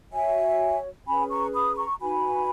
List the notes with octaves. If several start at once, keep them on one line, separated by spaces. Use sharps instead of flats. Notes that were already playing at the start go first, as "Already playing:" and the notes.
F#4 C#5 E5 G#5
C#4 G#4 B4 G#5 B5
A#5 C#6
B5 D#6
B5
A#5 C#6
D#4 F#4 B4 G#5 B5